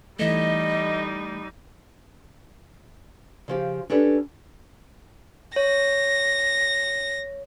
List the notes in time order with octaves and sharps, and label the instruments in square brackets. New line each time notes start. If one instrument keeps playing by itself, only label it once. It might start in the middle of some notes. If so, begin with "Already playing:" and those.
[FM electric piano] E3 A3 [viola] G3 D#4 [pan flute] D#5
[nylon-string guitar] C#3 F3 G4
C#4 D4 G4 A4 B4
[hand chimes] C#5 [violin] A#6